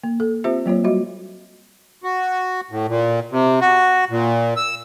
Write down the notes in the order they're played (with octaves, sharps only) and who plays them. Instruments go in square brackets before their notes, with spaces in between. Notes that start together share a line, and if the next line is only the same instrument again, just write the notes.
[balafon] A#3
A4
C4 F4 G4 C5 E5
F#3 A#3 F4 C#5
G3 F#4 D#5
[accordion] F#4
A2
A#2
C3
F#4
A#2
E6